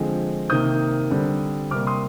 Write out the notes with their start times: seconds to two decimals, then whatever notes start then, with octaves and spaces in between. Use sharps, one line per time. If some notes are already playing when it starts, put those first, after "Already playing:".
Already playing: D3 F3 G#3 C4
0.50 C3 D#3 A#3 D#6 G6
1.10 D3 G3 C4
1.71 C3 G3 A#3 D6 F6
1.87 C6 D#6